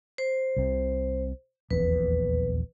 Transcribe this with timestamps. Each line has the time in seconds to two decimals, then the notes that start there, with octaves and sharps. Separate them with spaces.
0.18 C5
0.56 C2 C3
1.71 D#1 A#1 E2 B4